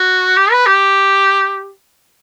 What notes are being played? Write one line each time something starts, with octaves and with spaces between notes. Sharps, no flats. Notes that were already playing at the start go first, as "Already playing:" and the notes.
Already playing: F#4
G4
B4
G4